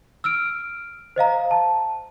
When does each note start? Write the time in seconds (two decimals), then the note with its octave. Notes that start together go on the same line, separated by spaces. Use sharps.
0.24 E6 F6 D7
1.16 C5 D#5 F5 A#5
1.51 A5